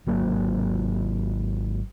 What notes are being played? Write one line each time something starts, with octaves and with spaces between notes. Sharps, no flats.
G#1 F#3 A#3